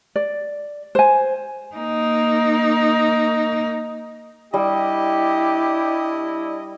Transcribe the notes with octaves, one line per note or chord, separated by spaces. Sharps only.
D5
C5 G#5
A#3 D#4
G3 D4 E4 G4 D5 D#5